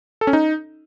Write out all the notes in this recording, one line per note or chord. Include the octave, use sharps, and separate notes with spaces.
A4
C#4
D#4